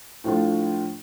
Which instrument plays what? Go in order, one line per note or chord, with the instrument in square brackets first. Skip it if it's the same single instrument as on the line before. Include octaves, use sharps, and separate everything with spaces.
[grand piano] A2 F3 A3 D4 F4